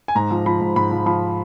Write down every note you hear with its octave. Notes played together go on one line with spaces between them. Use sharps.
G#5
G#2 A#5
F3
F3 B5
G#2
G#2 B5
F3
F3 B5